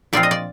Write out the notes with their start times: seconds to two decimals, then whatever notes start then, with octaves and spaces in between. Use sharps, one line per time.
0.13 A#2 F3 C4 F4 D5
0.23 D#5
0.31 D5